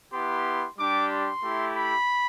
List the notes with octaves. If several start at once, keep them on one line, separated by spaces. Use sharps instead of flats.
B3 E4 G4 C6
G3 D4 G4 D6
C6
A3 E4 G4
B5